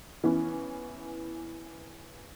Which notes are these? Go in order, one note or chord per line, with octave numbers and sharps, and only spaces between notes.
E3 B3 C#4